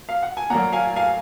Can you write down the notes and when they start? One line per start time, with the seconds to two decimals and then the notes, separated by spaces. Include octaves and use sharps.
0.09 F5
0.23 F#5
0.37 G#5
0.50 A#2 F#3 A#3 F#5 A#5
0.72 F5 G#5
0.96 F5 G#5